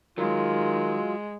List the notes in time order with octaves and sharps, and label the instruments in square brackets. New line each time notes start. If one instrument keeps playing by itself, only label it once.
[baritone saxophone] D#3 [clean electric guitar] F#3 [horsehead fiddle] G#3 [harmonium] F4